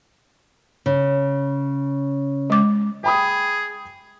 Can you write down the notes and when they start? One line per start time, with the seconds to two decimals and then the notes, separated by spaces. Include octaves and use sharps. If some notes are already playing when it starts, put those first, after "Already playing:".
0.86 C#3
2.50 G#3 D6
3.04 G#4 G5 B5 D#6